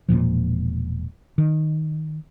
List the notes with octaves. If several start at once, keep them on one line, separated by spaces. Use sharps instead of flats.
E1 B1 A#2 F3
D#3